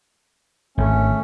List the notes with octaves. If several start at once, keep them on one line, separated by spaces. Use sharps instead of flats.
G#1 A3 C#4